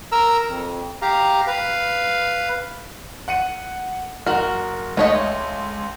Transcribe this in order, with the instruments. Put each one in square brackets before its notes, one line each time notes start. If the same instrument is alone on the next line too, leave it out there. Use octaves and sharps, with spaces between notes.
[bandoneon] A#4 A#5 E6
F2
G4 F5 A#5
B4 F5
[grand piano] F#5 C#7 D#7
[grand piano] F#1 [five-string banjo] F#4 A#4
[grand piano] C#2 [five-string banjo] A3 C#5 D#5